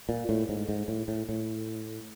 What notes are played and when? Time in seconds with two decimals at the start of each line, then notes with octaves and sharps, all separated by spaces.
0.09 A#2
0.29 A2
0.49 G#2
0.69 G#2
0.88 A2
1.08 A2
1.29 A2